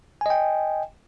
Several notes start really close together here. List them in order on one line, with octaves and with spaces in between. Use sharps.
G#5 D#5 G5